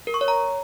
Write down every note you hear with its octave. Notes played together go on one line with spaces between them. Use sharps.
A#4
C#6
C#5
A#5